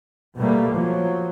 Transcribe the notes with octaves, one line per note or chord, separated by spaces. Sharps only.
B2 G3 A3 A#3
F3 F#3